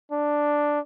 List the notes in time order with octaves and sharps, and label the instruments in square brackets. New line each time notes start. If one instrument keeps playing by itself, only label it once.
[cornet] D4